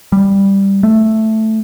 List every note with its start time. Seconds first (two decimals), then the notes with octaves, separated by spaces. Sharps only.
0.12 G3
0.83 A3